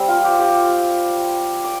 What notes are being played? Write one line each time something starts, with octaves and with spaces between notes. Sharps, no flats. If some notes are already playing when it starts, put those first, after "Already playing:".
Already playing: G3 C4
F4
G4
G4
D5